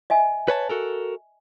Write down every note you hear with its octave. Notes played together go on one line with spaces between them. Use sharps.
D#5 E5 G#5
B4 C#5 A5
F#4 A4 A#4